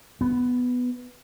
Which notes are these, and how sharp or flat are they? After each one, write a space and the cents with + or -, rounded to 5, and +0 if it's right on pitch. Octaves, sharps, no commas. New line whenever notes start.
B3 +5